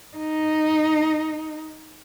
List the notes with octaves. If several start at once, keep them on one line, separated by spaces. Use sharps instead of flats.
D#4